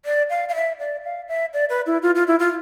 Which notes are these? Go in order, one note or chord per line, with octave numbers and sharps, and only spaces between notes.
D5
F5
F5
E5
D5
F5
E5
D5
B4
E4
F4
F4
E4
F4